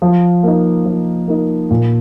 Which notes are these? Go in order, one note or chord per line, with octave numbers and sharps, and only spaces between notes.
F3
A#3 D#4
F3
A#3 D#4
A#2